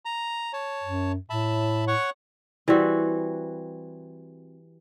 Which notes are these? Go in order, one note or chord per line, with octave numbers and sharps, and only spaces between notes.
A#5
C#5 A5
F#2
A2 E5 A5 B5
C#5 F#5 C#6
E3 G3 C4 F#4